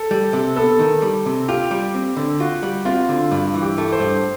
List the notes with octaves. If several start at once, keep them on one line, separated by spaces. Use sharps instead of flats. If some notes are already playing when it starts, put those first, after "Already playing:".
Already playing: A4
G3
C3
B3 A4
D#3
G3
C3
F4 G4
G3
C4
D3
F4 F#4
G3
C4 F4
D3
G2
E3
G4
A3
C5
G2